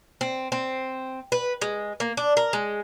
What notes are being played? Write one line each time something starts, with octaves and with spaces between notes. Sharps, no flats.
C4
C4
B4
G#3
A#3
D4
A#4
G#3